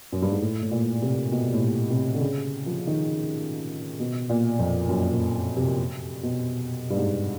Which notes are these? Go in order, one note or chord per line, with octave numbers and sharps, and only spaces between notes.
F#2
G2
G#2
A2
A2
A#2
C3
B2
A2
A#2
C3
D3
C#3
F3
D#3
B2
A#2
F2
F#2
A#2
C3
B2
G2
G#2